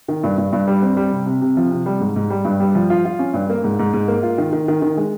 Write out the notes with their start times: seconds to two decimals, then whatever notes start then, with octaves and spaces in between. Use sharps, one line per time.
0.08 D#3
0.23 G2
0.38 G2
0.53 G2
0.67 G3
0.82 C4
0.97 G3
1.12 C3
1.26 C3
1.42 C3
1.57 F3
1.71 C3
1.86 G3
2.00 G#2
2.16 G#2
2.30 G3
2.45 G2
2.60 G3
2.75 F3
2.90 F4
3.05 F4
3.19 C#4
3.34 G2
3.50 A#3
3.64 G#2
3.79 G#2
3.93 G#2
4.08 A#3
4.23 F4
4.38 D#3
4.53 D#3
4.68 D#3
4.82 D#3
4.97 G#3